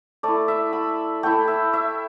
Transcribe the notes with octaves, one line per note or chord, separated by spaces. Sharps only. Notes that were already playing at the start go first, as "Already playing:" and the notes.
A3 E4 D5
E5
B5
A3 E4 G5
E5
E5